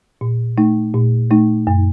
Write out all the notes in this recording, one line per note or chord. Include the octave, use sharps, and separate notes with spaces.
A#2
A3 D#4
A#2
A3 D#4
F#2